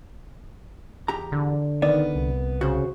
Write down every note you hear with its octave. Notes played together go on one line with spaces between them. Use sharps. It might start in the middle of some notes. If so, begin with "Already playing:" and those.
E2 G4 A#5
D3
D#3 B3 D5
C2
C#3 F#4 C5